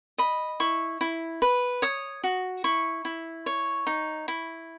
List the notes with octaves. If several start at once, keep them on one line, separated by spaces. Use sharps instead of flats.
D#5 B5
E4 C#6
E4
B4
C#5 D#6
F#4
E4 C#6
E4
C#5
D#4
E4